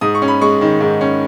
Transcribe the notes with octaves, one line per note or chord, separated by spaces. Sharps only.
G#2 D#6
C#6
C#4
B5
G#3 C#6
D#3
G#2
C#4